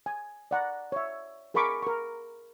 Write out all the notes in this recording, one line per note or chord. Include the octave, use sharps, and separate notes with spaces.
G#5
D5 F#5 A#5
C#5 E5
G#4 A#4 G#5 B5 C#6 D6
A#4 C#6